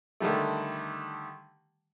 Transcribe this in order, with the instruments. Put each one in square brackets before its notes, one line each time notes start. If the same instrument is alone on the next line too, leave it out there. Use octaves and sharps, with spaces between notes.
[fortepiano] D3 D#3 G3 A3